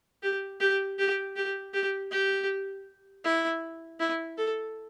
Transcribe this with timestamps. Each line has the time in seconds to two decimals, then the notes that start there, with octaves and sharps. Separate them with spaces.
0.23 G4
0.60 G4
0.99 G4
1.36 G4
1.74 G4
2.11 G4
3.25 E4
4.00 E4
4.38 A4